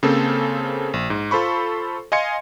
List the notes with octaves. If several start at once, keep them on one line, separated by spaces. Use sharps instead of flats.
C#3 A#3 C4 C#4 A4 C5
A#1
G#2
F4 A4 C5 B5 C#6
D#5 F5 G#5 C6 G#6 C#7